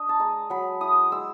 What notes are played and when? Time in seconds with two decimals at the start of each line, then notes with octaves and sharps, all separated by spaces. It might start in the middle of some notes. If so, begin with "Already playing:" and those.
Already playing: D4 D#5
0.09 A5
0.19 G#3 A#5
0.50 F#3 B5
0.80 E4 D#6
1.11 G#3 E6